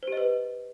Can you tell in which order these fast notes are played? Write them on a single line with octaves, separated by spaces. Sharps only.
C5 G4 D#5 B4